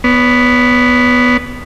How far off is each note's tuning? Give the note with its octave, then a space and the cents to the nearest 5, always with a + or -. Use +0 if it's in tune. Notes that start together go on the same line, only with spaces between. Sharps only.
B3 +0 C#5 +45